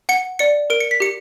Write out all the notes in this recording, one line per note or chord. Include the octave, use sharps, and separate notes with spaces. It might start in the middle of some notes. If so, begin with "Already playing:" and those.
F#5 C#7
D5 C#7
A#4 D7
C#7
B6
G4 C#7